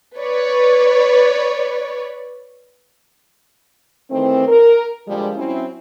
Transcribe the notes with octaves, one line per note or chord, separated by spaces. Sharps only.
B4 C#5 D5
D#3 E3 A3 C4
A#4
A#2 D3 F3 G3 G#3
F#3 C4 C#4 E4